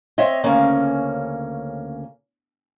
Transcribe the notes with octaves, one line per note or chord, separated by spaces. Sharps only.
C4 C#5 D#5 E5
D2 C#3 A#3 C#4